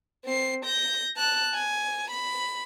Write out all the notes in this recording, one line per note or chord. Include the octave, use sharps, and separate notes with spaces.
C4 C7
G6 A#6
A5 F#6
G#5
B5